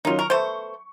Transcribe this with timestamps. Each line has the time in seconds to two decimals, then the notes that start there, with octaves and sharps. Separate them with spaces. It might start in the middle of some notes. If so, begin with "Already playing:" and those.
0.05 D#3 F#3 C#4 D#4 F4
0.19 A#4 C#6
0.30 A3 B3 C5